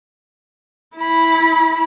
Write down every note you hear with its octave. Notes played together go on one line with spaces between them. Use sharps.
E4 B5